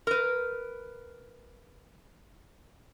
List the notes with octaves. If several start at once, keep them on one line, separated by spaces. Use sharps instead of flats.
A#4 B4